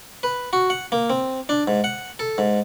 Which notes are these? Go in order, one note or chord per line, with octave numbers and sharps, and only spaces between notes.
B4
F#4
F#5
A#3
C4
D4
G#2
F#5
A4
G#2